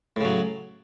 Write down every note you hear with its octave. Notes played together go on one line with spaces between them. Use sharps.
A2 C#3 F#3